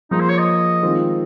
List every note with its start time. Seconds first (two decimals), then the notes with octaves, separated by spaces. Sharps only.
0.11 F3 A#3 D#4 F4 G#4
0.20 C5
0.29 C#5
0.38 D#5
0.82 D#3 G#3 C4 F4